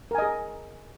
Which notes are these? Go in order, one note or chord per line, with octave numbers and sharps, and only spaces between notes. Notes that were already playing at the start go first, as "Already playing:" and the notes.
G#4 A#4 D#5 G#5